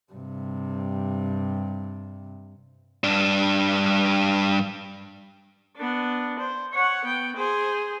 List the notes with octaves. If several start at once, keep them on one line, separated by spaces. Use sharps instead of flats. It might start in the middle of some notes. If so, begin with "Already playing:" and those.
G2 C3
G2 D4
B3 D4
C5
C#5 F#5
B3 G5
G#4 C5